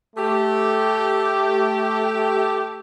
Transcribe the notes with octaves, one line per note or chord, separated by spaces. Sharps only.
A3 G4